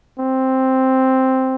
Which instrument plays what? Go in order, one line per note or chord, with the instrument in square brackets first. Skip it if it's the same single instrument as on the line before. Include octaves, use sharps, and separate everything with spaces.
[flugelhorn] C4